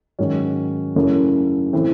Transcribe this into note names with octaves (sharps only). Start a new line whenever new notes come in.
G#2 D#3 F#3 C#4
F#2 C#3 E3 A3
A2 E3 C4